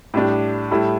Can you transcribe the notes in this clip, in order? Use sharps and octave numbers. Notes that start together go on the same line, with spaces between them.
A2 G3 D4 G4
A2 G3 E4 A4